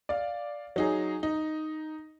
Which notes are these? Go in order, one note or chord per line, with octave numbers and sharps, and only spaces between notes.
D5 F5
F#3 D#4 G#4
D#4